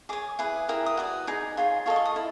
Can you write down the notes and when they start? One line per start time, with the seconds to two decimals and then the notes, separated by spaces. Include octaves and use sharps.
0.09 G#4 C#5 D6
0.39 E4 G#4 B4
0.68 E4 G4 A#4 D#6
0.86 D#6
0.97 F#4 B4 D5
1.27 D#4 G#4
1.57 F4 G#4 C#5
1.86 F4 A4 D#5 C#6
1.96 C#6
2.05 D#6
2.16 E4